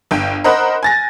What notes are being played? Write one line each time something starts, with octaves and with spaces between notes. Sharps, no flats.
G1 G5
A#4 C5 D#5 F#5 B5 F#6
G#5 A6 A#6